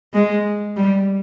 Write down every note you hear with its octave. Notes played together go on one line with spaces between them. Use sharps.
G#3
G3